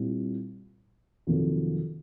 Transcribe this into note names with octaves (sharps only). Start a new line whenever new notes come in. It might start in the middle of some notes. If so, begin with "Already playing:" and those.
Already playing: A#2 G3 C4 E4
F2 C3 D#3 F#3 A#3